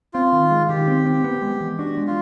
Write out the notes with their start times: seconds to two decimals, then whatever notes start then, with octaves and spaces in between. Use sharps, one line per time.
0.13 C4 F4
0.32 D#3
0.51 G#3
0.69 D#3 G4
0.87 C4
1.06 C4
1.24 B3
1.42 G#3
1.61 E3
1.79 D4 F#4
1.97 G#3
2.07 F4